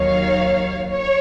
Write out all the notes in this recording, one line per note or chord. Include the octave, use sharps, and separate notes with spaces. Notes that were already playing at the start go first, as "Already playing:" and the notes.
Already playing: D#2 D#3 F#3 C#5 F5
C#5